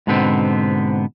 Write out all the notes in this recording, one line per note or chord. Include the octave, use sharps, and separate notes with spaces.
G#2 B2 D3 B3 C4